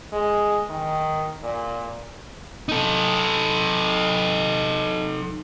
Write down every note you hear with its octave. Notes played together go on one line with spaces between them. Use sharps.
G#3
D#3
A#2
D#4 A4